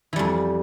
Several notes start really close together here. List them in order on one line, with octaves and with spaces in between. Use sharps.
E3 G3 F2